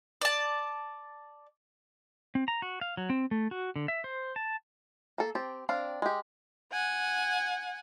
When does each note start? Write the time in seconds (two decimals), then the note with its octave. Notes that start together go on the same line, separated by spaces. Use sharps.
0.21 D5 A5
2.35 C4
2.48 A#5
2.62 F#4
2.81 F5
2.97 F#3
3.10 C4
3.31 A3
3.51 F#4
3.76 D3
3.88 E5
4.04 C5
4.36 A5
5.18 A#3 A4
5.35 C4 G4 A5
5.69 C4 D4 F5
6.02 G#3 G4
6.72 F#5 G#5